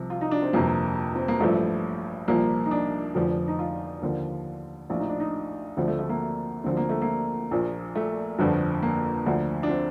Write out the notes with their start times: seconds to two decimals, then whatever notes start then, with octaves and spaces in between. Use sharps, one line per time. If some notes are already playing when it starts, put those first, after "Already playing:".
Already playing: C2 C3 F3
0.10 F4
0.21 D#4
0.31 D4
0.42 C4
0.53 G1 F2 C3 F3 A#3
1.15 C4
1.28 A#3
1.40 A1 G2 F3 A3
2.28 C2 A#2 F3 A#3
2.66 D#4
2.71 D4
3.15 F1 F2 D3 F3
3.48 D#4
3.59 F4
4.02 D#2 D3 F3
4.90 A#1 A2 F3 F4
5.00 D#4
5.10 D4
5.20 D#4
5.77 D2 D3 F3 C4
5.88 A3
5.99 A3
6.09 A#3
6.64 D2 D3 F3 C4
6.77 A#3
6.89 A3
7.02 A#3
7.51 A#1 A#2 F3
7.95 A3
8.39 G1 F2 D3 F3
8.83 A#3
9.26 D2 D3 F3
9.63 D4
9.69 C4